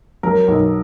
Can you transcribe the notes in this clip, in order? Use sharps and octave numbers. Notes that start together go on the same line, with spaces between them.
F#3 A#4
B1